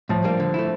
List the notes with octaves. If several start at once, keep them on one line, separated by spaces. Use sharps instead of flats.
A2 F3
G3 A#3 D4
D3
A3 E4